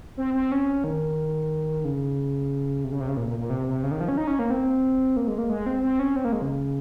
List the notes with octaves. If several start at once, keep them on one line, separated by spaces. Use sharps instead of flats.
C4
C4
C#4
D#3
C#3
C3
C#3
C3
C#3
A#2
A#2
A#2
C3
C3
C#3
D#3
F3
C#4
D#4
C#4
A#3
C4
A#3
G#3
A#3
G#3
C4
C4
C#4
C4
A#3
G#3
C#3